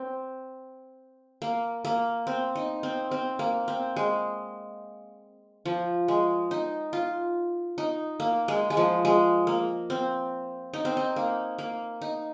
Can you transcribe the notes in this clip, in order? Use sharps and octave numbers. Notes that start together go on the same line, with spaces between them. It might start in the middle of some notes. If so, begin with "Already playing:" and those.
Already playing: C4
A#3
A#3
C4
D#4
C4
C4
A#3
C4
G#3
F3
G#3
D#4
F4
D#4
A#3
G#3
G#3
F3
G#3
A#3
C4
D#4
C4
D#4
A#3
A#3
D#4